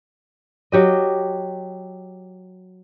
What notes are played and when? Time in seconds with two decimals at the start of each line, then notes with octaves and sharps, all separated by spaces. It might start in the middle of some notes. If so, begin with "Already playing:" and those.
0.72 F#3 G4 D#5